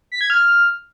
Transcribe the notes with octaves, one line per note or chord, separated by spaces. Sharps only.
B6
G#6
F6